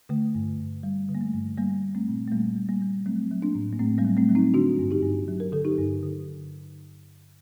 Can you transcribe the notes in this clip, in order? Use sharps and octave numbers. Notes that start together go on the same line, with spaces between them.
D3 A3
G2
G2
G3
D3
A#3
A3
G2
G3 A#3
G3
A3 C4
A#2
A3
A#2 G3 A#3
G3
G3 A#3
G3
F#3 A3 C4
F#3
A#3 D4
A2
A#3
A2 A3 C4
G3 A#3
F#3
A3 C4
F#3
C4 D#4
D3 D4 F#4
G2
D#4 G4
G2
F#3
A#4
D3 A4
D#4 G4
G2
D3